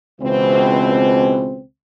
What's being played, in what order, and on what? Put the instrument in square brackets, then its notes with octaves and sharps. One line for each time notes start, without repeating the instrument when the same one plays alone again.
[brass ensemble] C#2 B2 E3 C4